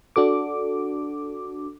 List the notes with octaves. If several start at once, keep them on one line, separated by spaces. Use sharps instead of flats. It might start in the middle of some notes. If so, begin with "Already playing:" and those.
D4 F#4 A4 D6